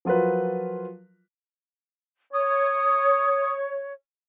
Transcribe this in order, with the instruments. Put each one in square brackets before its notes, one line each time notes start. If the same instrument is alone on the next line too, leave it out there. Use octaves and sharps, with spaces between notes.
[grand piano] F3 F#3 F4 A#4 B4
[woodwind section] C#5 [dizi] D#6